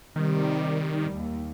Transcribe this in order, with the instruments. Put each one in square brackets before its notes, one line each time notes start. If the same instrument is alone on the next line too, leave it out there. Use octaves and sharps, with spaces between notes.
[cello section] C3 G3 [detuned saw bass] D#3
[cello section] D#2